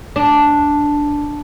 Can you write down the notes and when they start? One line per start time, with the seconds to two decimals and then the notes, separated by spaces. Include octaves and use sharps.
0.16 D4